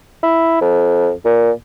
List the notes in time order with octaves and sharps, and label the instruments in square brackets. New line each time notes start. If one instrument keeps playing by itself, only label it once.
[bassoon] E4
F2
A#2